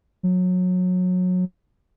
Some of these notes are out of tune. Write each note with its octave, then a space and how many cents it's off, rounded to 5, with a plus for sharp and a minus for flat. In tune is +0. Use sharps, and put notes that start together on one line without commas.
F#3 -25